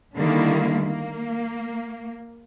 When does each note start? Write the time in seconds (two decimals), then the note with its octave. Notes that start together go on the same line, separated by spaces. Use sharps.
0.14 D3 D#3 G3 A#3 E4
0.83 A#3